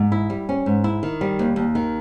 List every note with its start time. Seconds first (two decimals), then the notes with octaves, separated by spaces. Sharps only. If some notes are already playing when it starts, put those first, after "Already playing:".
Already playing: G#2
0.12 E4
0.30 G3
0.49 C#4
0.66 G#2
0.84 E4
1.03 D#3
1.21 G3
1.39 D#2
1.56 D#2
1.75 D#3